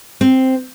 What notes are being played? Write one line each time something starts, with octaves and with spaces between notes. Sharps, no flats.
C4